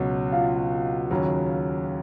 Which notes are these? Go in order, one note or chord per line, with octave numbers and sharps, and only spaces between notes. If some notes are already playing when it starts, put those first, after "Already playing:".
Already playing: C#2 B2 F#3 F#4 F#5
F4 F5
D#2 C#3 F#3